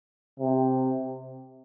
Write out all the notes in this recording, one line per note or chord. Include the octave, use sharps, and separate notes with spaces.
C3